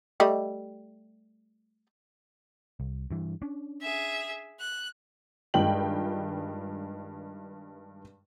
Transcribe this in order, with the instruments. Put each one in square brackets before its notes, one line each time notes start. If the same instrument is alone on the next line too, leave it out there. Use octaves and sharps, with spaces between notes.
[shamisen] G3 A3 D#5
[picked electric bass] C2
G2 E3
C#4 D4
[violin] G#4 E5
F#6
[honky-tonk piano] G2 D#3 G#3 F4 G5 F#7